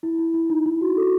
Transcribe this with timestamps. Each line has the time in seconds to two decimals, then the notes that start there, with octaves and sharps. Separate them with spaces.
0.03 E4
0.19 E4
0.34 E4
0.50 D#4
0.66 E4
0.81 F#4
0.97 A4